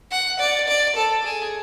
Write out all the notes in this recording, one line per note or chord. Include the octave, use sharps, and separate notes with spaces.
F#5
D5
D5
A4
G#4